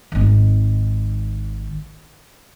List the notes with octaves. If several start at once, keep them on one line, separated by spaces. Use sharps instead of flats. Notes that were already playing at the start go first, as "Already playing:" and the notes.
G#1 D#3